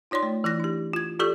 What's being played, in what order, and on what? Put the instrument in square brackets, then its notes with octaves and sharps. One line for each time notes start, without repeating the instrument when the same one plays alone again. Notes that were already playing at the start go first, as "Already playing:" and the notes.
[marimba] D#4 F4 C#5 D5 C6
A3
E3 E4 F#6 A#6
D4 G4
F4 G#6
F4 G4 A4 D5 C#6 E6